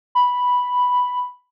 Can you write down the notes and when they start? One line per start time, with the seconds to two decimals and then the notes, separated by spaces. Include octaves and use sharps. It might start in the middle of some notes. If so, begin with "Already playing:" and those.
0.15 B5